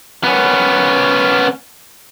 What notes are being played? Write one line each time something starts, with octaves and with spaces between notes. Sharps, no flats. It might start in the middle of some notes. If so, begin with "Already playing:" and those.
B3 C#4